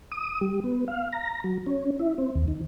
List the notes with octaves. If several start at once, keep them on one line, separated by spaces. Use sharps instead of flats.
D#6
G3
B3
F5
A#5
F#3
C#4
E4
C4
D#2
D#3